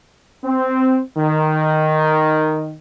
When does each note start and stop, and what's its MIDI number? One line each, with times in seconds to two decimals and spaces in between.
0.44 0.99 60
1.17 2.75 51